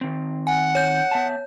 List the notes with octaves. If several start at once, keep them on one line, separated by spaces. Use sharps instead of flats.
D#3 C4
F#5 G#5
C#5 G6
B3 E5 A5